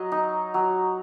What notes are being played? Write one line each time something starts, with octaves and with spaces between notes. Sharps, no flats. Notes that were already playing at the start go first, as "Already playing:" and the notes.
Already playing: F#3 D#5
D#4
F#3